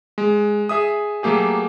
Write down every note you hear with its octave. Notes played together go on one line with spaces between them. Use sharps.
G#3
G#4 E5 D#6
F#3 A3 A#3 G4 G#4